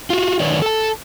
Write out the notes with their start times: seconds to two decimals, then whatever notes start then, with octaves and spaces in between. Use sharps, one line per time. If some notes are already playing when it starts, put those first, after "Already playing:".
0.10 F4 F#4
0.40 D3 D#3 B4 C#5 D5
0.62 A4 A5